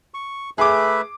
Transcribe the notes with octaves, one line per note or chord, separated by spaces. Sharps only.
C#6
A3 G#4 B4 E5 D6